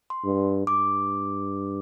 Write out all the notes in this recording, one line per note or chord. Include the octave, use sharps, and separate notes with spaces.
C6
G2
G2 D6